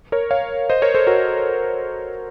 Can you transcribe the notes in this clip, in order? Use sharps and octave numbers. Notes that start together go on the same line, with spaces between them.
A#4 C#5
C#5 F5
C5 D#5
A#4 C#5
A4 C5
F#4 A#4